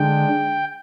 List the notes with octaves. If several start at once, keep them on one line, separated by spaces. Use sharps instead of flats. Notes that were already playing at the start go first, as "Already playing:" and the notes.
Already playing: D3 G#3 D4 G5